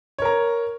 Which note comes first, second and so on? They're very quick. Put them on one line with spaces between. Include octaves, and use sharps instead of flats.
C#5 A#4 A#5